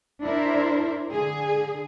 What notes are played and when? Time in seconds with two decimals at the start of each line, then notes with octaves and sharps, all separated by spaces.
0.24 D4 E4 A#4 C5
1.12 D3 G#4